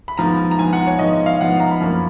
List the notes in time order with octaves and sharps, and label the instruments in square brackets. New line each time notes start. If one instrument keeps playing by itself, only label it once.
[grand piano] B5
G#2 F3 B3 A#5
A#5
G#2 F3 B3 G#5
F#5
C#5
G#2 F3 B3 D#5
D#5
F5
G#2 F3 B3 F#5
A#5
B5
F#2 F3 A#3 C#4